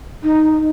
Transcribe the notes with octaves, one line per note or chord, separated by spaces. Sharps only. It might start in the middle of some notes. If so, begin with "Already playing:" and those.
D#4